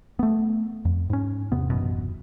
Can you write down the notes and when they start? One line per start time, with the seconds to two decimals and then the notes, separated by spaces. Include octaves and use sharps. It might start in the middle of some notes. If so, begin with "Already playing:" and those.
0.19 A3 B3
0.85 F2
1.10 G#2 C#4
1.52 E2 C3 B3
1.70 D#1 A1 F#2 B2